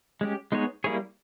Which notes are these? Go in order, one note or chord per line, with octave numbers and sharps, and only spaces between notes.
G#3 C#4 G4
G#3 B3 D#4 G#4 C#5
G3 A#3 E4 G#4 C#5